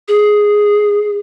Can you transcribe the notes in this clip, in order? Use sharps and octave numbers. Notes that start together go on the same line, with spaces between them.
G#4